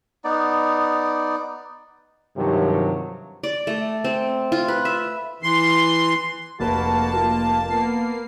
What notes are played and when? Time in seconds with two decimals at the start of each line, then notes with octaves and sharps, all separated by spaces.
0.24 B3 D#4 D5
2.35 G2 C3 D#3 F3 F#3
3.43 D5
3.67 A3
4.04 C4
4.52 F4
4.68 B4
4.85 E5
5.43 E3 C6
6.60 F1 A#3 F#4 B4 A5
7.16 F4
7.70 A#3 B3 C7